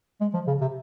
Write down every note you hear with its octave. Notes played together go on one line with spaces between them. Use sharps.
G#3
F3
C#3
C3